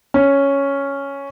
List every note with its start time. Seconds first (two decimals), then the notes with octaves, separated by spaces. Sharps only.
0.14 C#4